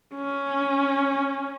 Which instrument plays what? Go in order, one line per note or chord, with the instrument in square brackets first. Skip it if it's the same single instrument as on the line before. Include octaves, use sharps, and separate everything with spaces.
[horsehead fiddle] C#4